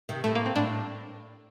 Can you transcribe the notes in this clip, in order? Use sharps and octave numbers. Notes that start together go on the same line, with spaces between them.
C3 D#3
A2 A3
A#3
C4
A2 D4